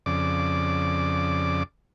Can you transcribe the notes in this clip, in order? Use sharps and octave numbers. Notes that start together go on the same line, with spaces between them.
F2 C#3 D5 D6